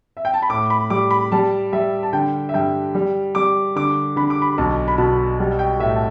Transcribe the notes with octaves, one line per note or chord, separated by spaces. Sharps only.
E5
G5
A5
B5
A2 D6
B5
G3 D6
B5
G3 A5
G3 E5
A5
D3 G5
E5
G2 G5
G3
G3 D6
D3 D6
D3 B5
D6
B5
B1 A5
B5
B2 A5
G3
G5
A2 E5
A5